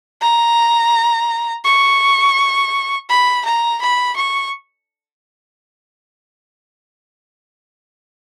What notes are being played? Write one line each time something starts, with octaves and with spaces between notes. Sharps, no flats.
A#5
C#6
B5
A#5
B5
C#6